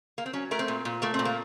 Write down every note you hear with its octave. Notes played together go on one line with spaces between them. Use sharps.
A#3
C4
F#3 C#4
A3 A#4
C4
A#2
A#2
A3 A#3
C4
A#2
A#3